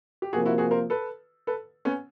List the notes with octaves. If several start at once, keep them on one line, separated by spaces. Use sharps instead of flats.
G4
C3 F3 A#3 F#4 G#4
E4 F#4
F#4 G#4
A#4 C5
A4 B4
A4 B4
B3 C#4